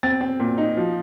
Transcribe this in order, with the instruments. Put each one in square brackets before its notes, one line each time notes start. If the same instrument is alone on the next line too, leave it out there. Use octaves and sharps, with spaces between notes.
[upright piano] C4 A6
C4
A#2
D#4
F3